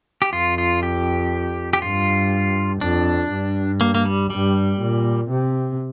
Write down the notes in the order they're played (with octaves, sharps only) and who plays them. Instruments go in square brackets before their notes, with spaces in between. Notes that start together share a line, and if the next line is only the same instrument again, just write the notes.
[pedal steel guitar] G4
[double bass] F2 [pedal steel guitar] F4
[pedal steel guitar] F4
G4
G4
[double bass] G2 [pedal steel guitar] F4
[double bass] F2 [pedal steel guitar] D4
[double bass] G2
[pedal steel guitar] A#3
A#3
G3
[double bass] G2 [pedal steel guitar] G3
[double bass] A#2
C3